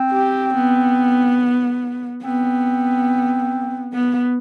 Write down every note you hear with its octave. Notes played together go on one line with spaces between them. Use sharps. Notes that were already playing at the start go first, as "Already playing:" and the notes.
Already playing: C4
G4
B3
B3 C4
B3